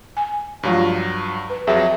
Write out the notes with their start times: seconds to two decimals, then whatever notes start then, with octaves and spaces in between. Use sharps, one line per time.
0.17 G#5
0.63 G2 F3 F#3 G#3 F4
1.50 B4
1.67 F2 F#3 G#4 E5 G5